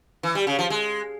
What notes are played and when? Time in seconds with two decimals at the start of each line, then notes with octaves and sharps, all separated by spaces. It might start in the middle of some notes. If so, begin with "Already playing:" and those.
0.23 E3
0.35 G3
0.47 C#3
0.59 F3
0.70 G#3